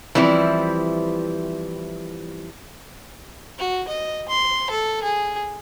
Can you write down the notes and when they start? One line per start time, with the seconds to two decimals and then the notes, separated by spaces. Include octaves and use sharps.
0.15 E3 F3 G3 C4 E4
3.59 F#4
3.88 D#5
4.29 C6
4.70 A4
5.03 G#4